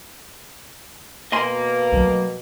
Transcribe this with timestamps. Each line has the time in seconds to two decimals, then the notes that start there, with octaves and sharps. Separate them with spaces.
1.32 B2 A#3 D#5 G#5 C6
1.92 F#3 A3